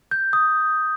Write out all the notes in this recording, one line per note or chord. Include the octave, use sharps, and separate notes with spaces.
G6
D#6